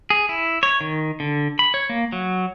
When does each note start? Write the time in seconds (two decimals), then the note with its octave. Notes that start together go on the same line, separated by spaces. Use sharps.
0.10 G#4
0.29 E4
0.63 C#5
0.81 D#3
1.20 D3
1.59 B5
1.74 C#5
1.89 A#3
2.12 F#3